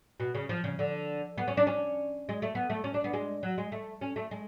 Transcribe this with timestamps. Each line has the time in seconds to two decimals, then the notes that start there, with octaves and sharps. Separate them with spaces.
0.20 B2
0.35 C#3
0.49 F3
0.64 C#3
0.79 D3
1.38 B3
1.48 C#4
1.57 D4
1.67 C#4
2.29 G#3
2.42 A3
2.55 B3
2.70 A3
2.84 C#4
2.94 D4
3.04 B3
3.13 G#3
3.43 F#3
3.58 G#3
3.72 A3
4.01 C#4
4.16 A3
4.31 G#3